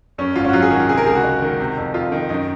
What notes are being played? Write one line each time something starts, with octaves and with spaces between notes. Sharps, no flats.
F#2 C#4
G#1 F4
C#4
F#4
F#3 F4
G#4
D#3 F#4
F4
C3 G#4
A#4
C#2 G#4
F#4
G#3
D#3
C3
F2
F2 F4
D#3
F#2 D#4